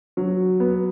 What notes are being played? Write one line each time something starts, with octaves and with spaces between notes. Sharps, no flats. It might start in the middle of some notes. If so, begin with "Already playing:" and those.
F#3
B3